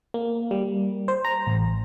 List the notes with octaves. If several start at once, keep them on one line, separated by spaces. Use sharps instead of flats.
A#3
G3
C5
A#5
A1